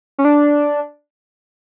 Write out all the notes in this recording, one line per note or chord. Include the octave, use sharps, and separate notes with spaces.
C#4
D4